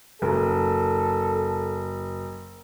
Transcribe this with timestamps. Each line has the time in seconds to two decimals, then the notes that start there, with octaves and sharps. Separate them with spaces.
0.22 F#1 A4